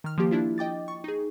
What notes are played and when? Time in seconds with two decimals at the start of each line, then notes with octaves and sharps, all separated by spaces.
0.04 D#3 F6
0.18 F3 A#3 G4
0.31 D4 E4 F4
0.58 D#5 G5 D6 A6
0.88 C#6
1.04 D#4 G#4